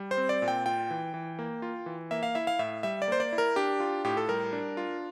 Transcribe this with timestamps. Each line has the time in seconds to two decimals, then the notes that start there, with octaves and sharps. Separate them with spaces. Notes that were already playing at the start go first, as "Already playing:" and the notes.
Already playing: G3
0.11 C5
0.17 C4
0.29 D5
0.42 A#2
0.48 G5
0.66 F4 G5
0.91 E3
1.14 E3
1.39 A#3
1.62 F4
1.86 E3
2.11 A#3 E5
2.23 F5
2.35 E4 E5
2.47 F5
2.59 A2 E5
2.83 G3 E5
3.02 D5
3.08 A#3 C5
3.20 D5
3.33 E4
3.38 A#4
3.56 D4 G4
3.80 F4
4.04 A2 G4
4.17 A4
4.29 G3 A#4
4.53 D4
4.77 F4